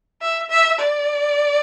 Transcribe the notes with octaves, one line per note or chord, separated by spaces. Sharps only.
E5
E5
D5